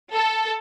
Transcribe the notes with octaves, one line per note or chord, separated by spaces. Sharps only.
A4